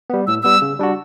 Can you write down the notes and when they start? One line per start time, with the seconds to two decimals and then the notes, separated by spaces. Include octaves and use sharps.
0.10 G3 B3
0.27 A2 E6
0.43 G3 B3 E6
0.62 C#3
0.79 G3 D4 F#4